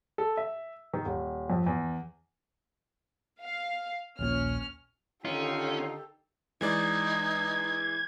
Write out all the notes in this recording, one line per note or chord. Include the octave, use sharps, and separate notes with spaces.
A4
E5
D#3
D#1
F2
E2
F5
A#1 D#2 A#2 C#4 F6
D3 D#3 C#4 D#4 F4 G4 A4
E3 G#3 D#4 D5 G#6